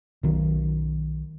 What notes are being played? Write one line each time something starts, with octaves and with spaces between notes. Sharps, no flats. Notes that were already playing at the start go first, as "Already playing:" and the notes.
B1 D#3